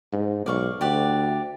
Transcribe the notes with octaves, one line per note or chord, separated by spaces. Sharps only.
G#2
B1 D5 F5 C#6
D2 G4 D5 F#5